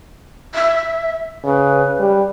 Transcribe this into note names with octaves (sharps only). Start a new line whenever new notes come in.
E5
C#3 B4
G3